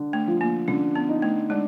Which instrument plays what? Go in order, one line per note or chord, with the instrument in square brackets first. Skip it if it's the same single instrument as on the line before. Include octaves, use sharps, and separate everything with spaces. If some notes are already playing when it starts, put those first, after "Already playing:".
Already playing: [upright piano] D3
[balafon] A3
[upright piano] F3
[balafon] A#3
[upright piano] D3 [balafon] C#4
[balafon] B3
[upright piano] D#4
[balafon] A3
[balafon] G#3 [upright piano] D4